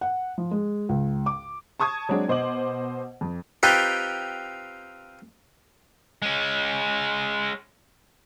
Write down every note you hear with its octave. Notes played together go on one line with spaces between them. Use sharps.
F#5
F3
G#3
C#2
D6
A5 C#6 D#6 G#6
F#3 G#3 C4 D4 G#4
B2 C5 D#5 D6 F#7
F2
C4 D#4 F4 G4 B4
G#3 C#4